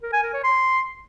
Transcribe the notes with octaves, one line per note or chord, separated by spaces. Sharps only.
A#4
G#5
A#4
C#5
C6